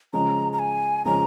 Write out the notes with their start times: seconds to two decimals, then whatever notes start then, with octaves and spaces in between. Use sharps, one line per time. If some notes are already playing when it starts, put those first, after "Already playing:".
0.13 C#3 F3 G#3 C#4 A#5
0.53 A#5
0.59 G#5
1.05 C#3 F3 G#3 C#4 A#5